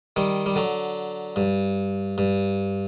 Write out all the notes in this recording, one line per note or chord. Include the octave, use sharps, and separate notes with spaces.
D#3 G3
G3
D3 F#3
G2
G2